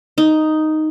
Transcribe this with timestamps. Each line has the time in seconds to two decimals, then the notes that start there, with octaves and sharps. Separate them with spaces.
0.18 D#4